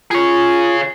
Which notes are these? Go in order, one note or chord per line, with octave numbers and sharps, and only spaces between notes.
F4 G#4 C#5